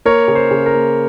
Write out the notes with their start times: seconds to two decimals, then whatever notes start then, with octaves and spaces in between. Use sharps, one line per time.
0.05 A#3 A#4 C#5
0.28 C#3
0.35 C5
0.51 C#3
0.66 A#4
0.73 A#3